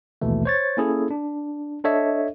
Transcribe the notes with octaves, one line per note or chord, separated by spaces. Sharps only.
A#1 D#2 B2 E3 A3
C5 C#5 A6
A#3 C#4 E4 G#4 A4
D4
D4 A4 C#5 D#5 E5